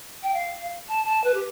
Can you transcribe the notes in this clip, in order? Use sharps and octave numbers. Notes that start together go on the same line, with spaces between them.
G5
F5
A5
A5
B4
G4